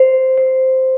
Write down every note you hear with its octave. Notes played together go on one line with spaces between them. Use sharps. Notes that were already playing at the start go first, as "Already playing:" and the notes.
Already playing: C5
C5